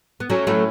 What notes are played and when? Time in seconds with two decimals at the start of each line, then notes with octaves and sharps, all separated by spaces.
0.20 B3
0.30 F#3 A3 C#4
0.47 A2 F#3 A3